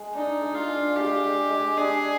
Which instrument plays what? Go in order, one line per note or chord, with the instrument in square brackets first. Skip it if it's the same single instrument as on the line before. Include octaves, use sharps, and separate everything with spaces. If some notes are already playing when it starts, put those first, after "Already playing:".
Already playing: [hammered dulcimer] G#3 G#4
[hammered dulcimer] D4 [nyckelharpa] D#4
[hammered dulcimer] G#3
[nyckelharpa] F4
[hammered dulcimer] D4
[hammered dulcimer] G#3 [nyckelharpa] G4
[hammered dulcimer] G#3
G#3
[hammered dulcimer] D4 [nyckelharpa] G#4